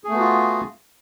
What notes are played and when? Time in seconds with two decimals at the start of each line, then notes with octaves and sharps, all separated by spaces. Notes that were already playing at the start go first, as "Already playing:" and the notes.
0.04 G#4
0.08 A3
0.12 B3
0.16 F#4
0.20 F4